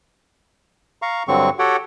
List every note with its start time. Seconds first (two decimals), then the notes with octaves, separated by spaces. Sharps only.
1.02 F5 A#5 C#6
1.28 G2 D3 F#3 C4 C#6
1.59 F#4 G4 A4 C#5 F#5 G5